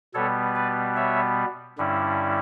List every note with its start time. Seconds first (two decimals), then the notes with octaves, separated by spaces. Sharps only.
0.14 B2 G3 B3 A4 C#5
0.55 B4 D5
0.96 C#5 E5
1.78 G2 D3 G3 C#4 E4